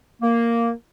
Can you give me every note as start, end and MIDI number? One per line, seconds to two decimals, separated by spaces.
0.22 0.71 58